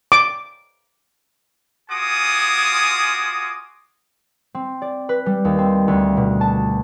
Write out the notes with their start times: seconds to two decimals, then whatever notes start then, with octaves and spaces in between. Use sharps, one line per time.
0.12 D6
1.91 F4 F#4 G#4 G#5 D6 D#6
4.55 C4
4.82 D5
5.09 B4
5.26 G3
5.45 D#2
5.58 C4
5.88 D2
6.17 B2
6.41 A5